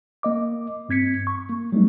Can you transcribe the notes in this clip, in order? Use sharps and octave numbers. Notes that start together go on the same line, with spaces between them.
A#3 D#5 D6
G2 C4 G#6 B6 C#7
C#6
A#3
F#3 G3 A3 B3 D#4